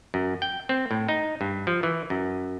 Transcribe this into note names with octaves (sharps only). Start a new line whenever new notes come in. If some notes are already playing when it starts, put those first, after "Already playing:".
F#2
G5
C4
A2
D#4
G2
F3
E3
F#2